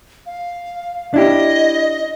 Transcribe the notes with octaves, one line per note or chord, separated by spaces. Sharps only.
F5
D4 E4 G4 D#5